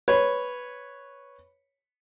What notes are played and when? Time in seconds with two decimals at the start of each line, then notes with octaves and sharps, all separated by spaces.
0.08 B4 C#5